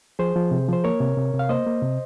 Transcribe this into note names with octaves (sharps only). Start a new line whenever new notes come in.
F3 G#4 C5
F3
C3
F3 C5
A#3 A#4 C#5
C3
C3
C3
F5
A#3 C5 D#5
A#3
C3